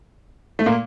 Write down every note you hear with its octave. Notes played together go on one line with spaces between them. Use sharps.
A3
A#2 A#3